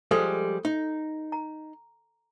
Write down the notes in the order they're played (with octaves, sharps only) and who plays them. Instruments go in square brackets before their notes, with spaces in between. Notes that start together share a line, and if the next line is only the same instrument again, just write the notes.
[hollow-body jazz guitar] F3 G3 G#3 [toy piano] A4
[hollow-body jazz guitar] D#4
[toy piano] A#5